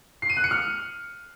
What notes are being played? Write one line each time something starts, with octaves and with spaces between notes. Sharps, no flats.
C7
D#7
F#6
C#7
F6